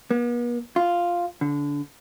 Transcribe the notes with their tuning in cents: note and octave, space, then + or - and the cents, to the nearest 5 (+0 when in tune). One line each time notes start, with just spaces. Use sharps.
B3 -45
F4 +0
D3 -25